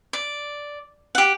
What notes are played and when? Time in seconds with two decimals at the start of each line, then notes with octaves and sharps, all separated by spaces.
0.13 D5
1.15 G4 F#5